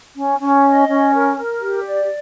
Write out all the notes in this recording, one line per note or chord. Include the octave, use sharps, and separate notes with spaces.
C#4
C#4
D#5
C#4
A#4
A#4
G4
D5